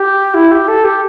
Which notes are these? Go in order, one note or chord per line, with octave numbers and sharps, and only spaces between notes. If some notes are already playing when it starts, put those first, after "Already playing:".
Already playing: G4
E4
G4
A4
G4